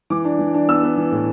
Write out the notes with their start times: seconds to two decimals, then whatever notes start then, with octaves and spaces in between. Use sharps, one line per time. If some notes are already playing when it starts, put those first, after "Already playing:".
0.10 E3 D6
0.25 D4
0.39 E3
0.54 D4
0.68 B3 E6
0.83 B3
0.98 E3
1.12 A2